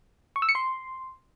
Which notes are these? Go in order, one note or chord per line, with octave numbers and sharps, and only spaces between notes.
C#6
E6
C#7
C6